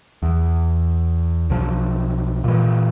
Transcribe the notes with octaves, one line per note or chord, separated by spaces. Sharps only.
E2
B1 F3
A#2 E3